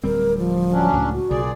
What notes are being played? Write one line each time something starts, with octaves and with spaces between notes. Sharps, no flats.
D1 G3 C4 A#4
F3
F#3 C#4 D4
C#2 A2
F#4
B1 A#2 C#3 G#4 D5